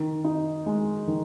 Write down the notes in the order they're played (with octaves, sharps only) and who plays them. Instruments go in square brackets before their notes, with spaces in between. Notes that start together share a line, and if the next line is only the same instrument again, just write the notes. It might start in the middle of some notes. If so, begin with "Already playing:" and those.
Already playing: [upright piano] D#3
D#4
G#3
D#3